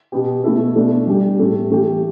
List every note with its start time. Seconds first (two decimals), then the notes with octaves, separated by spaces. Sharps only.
0.12 B2 B3 G4
0.44 B2 A3 E4 A4
0.76 B2 A3 D4
1.07 G3 D4 G4
1.39 A2 A3 G4
1.70 E3 A3 G4